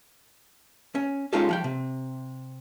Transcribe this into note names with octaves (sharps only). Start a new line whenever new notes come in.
C#4
G#3 C#4 D#4 F4 G4 A4
F3 F#5 G5
C3